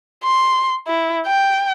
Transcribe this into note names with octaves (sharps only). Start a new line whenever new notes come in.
C6
E4
G5